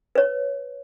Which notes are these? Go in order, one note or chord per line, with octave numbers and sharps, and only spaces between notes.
B4 C#5